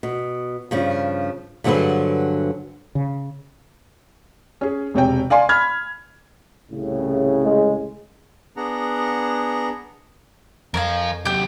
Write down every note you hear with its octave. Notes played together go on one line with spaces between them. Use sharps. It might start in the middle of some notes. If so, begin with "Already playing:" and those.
B2
G2 C#3 F3
G2 D3 F#3 C4 G#4 B4
C#3
C#4 G#4
E1 C3 C#5 G5
D5 F5 G#5 C6
B5 F6 G#6
C2 A2 C#3
G#3
B3 D4 G#4 F#5 A#5
F2 F3 A#4 C#5 F5 G#5
C3 F#3 G4 G6